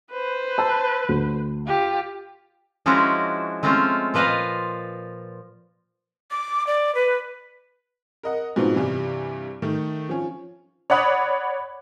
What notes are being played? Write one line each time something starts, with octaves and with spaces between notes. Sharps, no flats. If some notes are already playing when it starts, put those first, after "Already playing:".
B4 C5
A5 E6
D2
F4 G4
F3 G#3 C#4 D4 E4 F#4
G#3 A3 C4 C#4 F4
A#2 F3 B4 D5 D#5 F5
D6
D5
B4
A#4 D#5 F#5
G#2 B2 F3 B3 C4 D#4
G2 C3 E3 G3
D#3 A3
F3 C#4
C#5 D5 F#5 B5 D#6